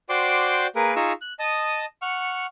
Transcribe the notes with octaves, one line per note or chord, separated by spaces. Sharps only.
F#4 C5 D5 G5 C6 D6
A#3 G#4 A#4 B4
D#4 F4 G#4 A#5 C#6 E6
F#6
D#5 A5 D#6
F#5 C#6 F6